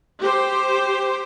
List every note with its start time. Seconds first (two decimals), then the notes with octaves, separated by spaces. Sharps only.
0.21 G4 C5